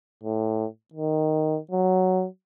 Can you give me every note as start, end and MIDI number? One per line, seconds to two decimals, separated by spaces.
0.23 0.66 45
0.93 1.59 51
1.71 2.26 54